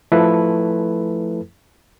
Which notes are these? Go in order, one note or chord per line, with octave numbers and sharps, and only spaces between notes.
F3 A3 E4 A4 B4